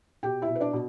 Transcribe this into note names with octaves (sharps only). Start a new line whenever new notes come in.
B2 G4 G5
E4 E5
B2
B4
D4 D5
B2